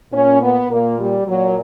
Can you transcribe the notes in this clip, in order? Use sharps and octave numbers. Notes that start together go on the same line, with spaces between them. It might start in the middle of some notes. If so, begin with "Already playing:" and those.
A#2 C#4
B3
A#2 A#3
G3
A#2 F#3